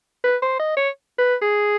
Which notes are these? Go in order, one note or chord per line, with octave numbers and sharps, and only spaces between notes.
B4
C5
D#5
C#5
B4
G#4